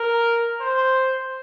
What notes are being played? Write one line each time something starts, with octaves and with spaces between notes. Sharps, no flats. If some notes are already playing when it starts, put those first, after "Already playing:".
Already playing: A#4
C5